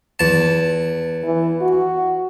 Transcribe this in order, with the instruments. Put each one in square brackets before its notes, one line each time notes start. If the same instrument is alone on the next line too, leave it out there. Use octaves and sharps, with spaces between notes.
[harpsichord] E2 A5
[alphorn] E3
F#4